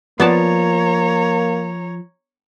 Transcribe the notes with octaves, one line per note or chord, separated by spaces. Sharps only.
F3 A#3 B3 C#5 D5 A5 A#5